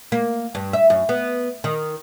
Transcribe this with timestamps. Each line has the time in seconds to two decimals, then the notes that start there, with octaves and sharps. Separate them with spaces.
0.12 A#3
0.55 G2
0.73 E5
0.90 F#2
1.09 B3
1.64 D#3